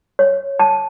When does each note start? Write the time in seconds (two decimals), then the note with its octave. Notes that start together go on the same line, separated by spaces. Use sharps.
0.19 C#5
0.59 A5